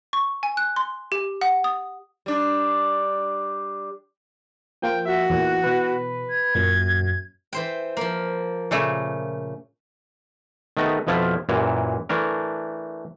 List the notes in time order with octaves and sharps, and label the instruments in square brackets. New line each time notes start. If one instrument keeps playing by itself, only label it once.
[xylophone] C#6
G#5
F#6
C6
G4
F#5
D#6
[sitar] G3 D4
[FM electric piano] F3 A#3 F4 [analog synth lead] G5
[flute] F#4 [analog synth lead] E5
[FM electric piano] E2 A#2 [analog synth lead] E3
[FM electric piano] B2 E3 [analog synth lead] B4
[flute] G#6
[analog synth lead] F#2 [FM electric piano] A#2
[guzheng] E3 C5 G5
F3 A#3
[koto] A#2 C#3 A3
[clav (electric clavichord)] D#3 A3 B3 D#5
F2 B2 F3 E4 F4
F#2 A#2 E3
E3 A3 D4 A#4